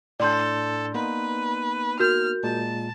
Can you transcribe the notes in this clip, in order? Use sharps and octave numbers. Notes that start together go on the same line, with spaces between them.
A2 D4 A4 D5 C6 G6
A#3 B3 D#4 B4
F#4 A#4 F6 G6
A#2 G#3 A5